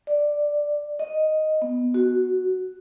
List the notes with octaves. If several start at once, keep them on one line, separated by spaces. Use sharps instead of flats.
D5
D#5
B3
F#4